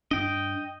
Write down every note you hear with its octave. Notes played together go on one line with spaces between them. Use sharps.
G2 D4 D#5 G5